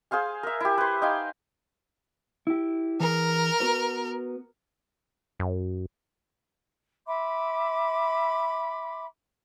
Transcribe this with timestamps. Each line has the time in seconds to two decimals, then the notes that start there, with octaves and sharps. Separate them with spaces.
0.11 G#4 C5 F5 G#5
0.43 A#4 E5
0.60 E4 G4
0.78 B4 C5
1.02 D#4 F5 G5 G#5
2.47 E4 G4
3.00 E3 G#4 A#4 G#5
3.60 B3 F#4 B4
5.39 F#2
7.06 E5 B5 C6 D6